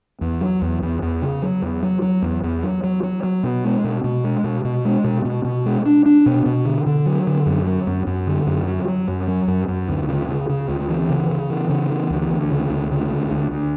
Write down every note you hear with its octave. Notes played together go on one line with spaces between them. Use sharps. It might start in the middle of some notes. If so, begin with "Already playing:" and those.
E2
F#3
E2
E2
E2
C#3
F#3
E2
F#3
F#3
E2
E2
F#3
F#3
F#3
F#3
B2
G#3
B2
B2
G#3
B2
B2
G#3
B2
B2
B2
G#3
D4
D4
B2
B2
D3
D3
F#3
D3
F#2
F#3
F#2
F#2
D3
F#2
F#3
F#3
F#2
F#3
F#2
F#2
D2
C#3
C#3
C#3
D2
E3
C#3
C#3
E3
C#3
E3
D2
D2
C#3
D2
C#3
D2
D2
D2